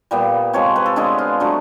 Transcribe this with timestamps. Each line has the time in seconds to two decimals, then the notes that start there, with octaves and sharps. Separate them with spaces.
0.11 A#2 G3 B3
0.53 C3 F3 G#3 C#5
0.76 B4
0.86 A4
0.96 D3 F3 G#3 B3 G#4
1.18 F4
1.40 D3 F#3 A3